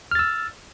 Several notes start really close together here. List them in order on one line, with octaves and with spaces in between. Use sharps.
F6 A6 E6